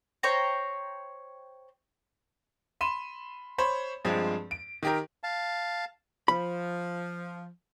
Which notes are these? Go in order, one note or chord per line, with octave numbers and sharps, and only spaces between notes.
C5 C#5 G5 A#5
B5 C6 D#7 E7
C5 C#5 B5
G2 F3 G#3 C4
D7
D#3 G4 A#4
F5 A5
F3 B5